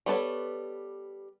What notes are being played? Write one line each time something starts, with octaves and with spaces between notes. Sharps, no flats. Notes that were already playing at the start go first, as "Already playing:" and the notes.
G3 B3 A4 C#5